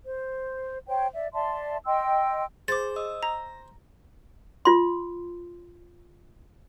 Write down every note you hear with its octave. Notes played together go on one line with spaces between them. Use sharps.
C5
C5 C#5 G5
D5 E5
D5 E5 A5 C6
D#5 G5 C6 E6
G#4 C5 D6 A6
D#5 D#6 E6
A#5 A#6
F4 C6